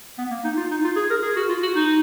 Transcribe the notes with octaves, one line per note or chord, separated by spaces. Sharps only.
B3
A#3
D#4
F4
D#4
F4
G#4
A#4
G#4
F#4
F4
F#4
D#4